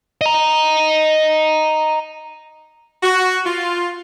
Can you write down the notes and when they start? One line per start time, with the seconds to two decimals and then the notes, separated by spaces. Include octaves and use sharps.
0.21 D#5 A#5
3.03 F#4
3.46 F4